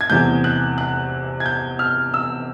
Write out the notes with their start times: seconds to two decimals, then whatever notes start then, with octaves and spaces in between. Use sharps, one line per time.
0.01 G#6
0.10 E2 C3 E3 A3 G6
0.44 F#6
0.78 F#6
1.40 G#6
1.46 G6
1.79 F6
2.14 E6